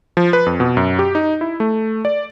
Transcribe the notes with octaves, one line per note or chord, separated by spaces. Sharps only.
F3
B4
F2
B2
F#2
G4
D#4
E4
A3
D5